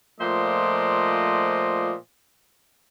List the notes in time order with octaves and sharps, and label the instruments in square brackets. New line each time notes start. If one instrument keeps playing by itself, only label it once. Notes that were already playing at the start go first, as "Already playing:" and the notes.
[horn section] A#2 F3 A3 C5 D5 D#5